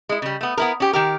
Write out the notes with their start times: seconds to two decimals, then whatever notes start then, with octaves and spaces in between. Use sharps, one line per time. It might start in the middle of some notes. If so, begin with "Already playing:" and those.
0.09 G#3 E4
0.22 C#3 G3
0.41 A3 B3
0.57 B3 E4 A#4
0.80 C#4 G4
0.93 D#3 G4 A#4